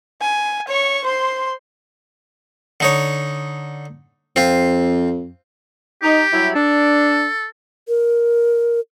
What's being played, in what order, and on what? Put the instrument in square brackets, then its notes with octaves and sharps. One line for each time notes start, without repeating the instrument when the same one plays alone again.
[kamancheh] G#5
C#5 C#6
C5 C6
[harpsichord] D3 D#4 C#5
[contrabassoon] F2 [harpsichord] C4 F4
[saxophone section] D#4 [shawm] G4
[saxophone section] F#3 G3 E4
[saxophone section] D4 [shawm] A4
[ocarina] A#4